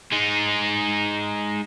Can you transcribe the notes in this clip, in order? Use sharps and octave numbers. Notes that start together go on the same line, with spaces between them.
G#3 D#4